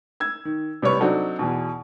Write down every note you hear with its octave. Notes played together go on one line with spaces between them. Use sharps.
E6 G#6
D#3
C3 G3 B4 C#5 C#6
F#3 C4 D4 D#4 F#4 A4
E2 B2